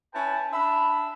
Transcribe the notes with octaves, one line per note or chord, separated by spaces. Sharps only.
C#4 E4 B4 G5 A5
D4 E5 B5